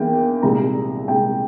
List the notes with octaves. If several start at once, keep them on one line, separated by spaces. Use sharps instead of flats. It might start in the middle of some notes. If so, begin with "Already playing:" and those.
Already playing: E2 E3 A#3 G5
C2 A#2 G#3 A#5
C2 A#2 G#3 G5